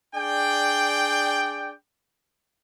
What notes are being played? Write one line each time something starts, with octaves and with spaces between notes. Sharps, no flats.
D4 G#4 D5 G5